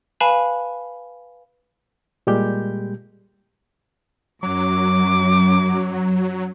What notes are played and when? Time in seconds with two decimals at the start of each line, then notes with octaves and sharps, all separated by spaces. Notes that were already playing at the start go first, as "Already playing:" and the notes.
0.20 B4 F5 G#5 A5 B5
2.27 A#2 G3 G#3 G4 G6
4.43 F#2 F#3 D6